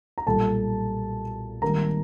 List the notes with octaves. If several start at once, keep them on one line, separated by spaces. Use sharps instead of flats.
A#5
B1 A#2 G3 A4 A5
G#1 G#2 D#3 G3 A#3 A#4 A#5